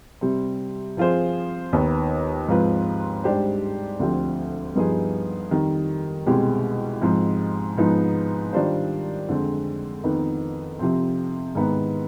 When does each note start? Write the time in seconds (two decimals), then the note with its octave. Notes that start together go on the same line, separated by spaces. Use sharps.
0.21 C3 G3 C4
0.97 F3 C4 F4 G#4 C5
1.73 D#2 D#3 B3
2.48 G#2 F3 C4 F4 B4
3.24 G#2 G3 D4 G4 C5
3.99 D2 D3 F3 C4 G4
4.75 G2 F3 B3 D#4 G#4
5.51 F2 D#3 G3
6.26 C2 B2 G#3 C4 G4
7.02 G#2 F3 C4
7.78 G#2 F3 B3 D#4
8.53 D#3 G3 D4 F4 C5
9.28 F2 D3 G#3 C4
10.04 F2 D#3 B3 D#4 B4
10.79 C3 F3 C4
11.55 G#2 D#3 B3